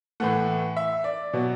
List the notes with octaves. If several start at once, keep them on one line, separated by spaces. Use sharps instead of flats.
A2 E3 A3 F#5
E5
D5
B2 F#3 B3